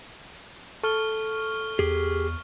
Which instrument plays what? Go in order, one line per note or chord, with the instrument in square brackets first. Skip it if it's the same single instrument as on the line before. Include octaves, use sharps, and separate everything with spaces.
[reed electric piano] A4 [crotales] C#6 F6 G7
[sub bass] E2 [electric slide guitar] G4 G#4